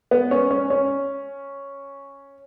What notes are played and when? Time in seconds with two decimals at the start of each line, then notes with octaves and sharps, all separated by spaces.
0.11 B3
0.31 C#4
0.51 C#4
0.70 C#4